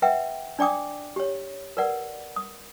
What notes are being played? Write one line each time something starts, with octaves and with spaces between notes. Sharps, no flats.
B4 E5 F#5 G5
D4 D5 G5 D6 D#6
G4 C#5
A#4 B4 D5 F#5
D#6